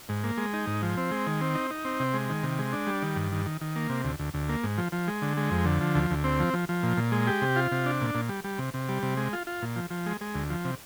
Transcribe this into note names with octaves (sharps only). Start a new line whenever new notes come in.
G#2
A#3
G#3
D#4
G#2
F3
C4
G#3
D#3
C4
D#4
D#4
C4
C3
G#3
D#3
C3
G#3
D4
G3
D#3
G2
D#3
D#3
D#3
A#3
C3
D2
D2
D2
A#3
G#2
F3
F3
G#3
D3
G#3
F2
D3
F3
D2
D2
C4
F3
F3
F3
A#2
A#2
G#3
G4
C3
F4
C3
D4
A#2
A#2
G3
G3
C3
C3
G3
C3
G#3
F4
F4
A#2
F3
F3
G#3
G#3
D2
F3
C3